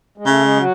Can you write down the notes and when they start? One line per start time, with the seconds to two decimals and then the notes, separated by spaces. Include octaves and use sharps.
0.18 G#3
0.26 C#3 A3
0.42 G#3
0.56 F#3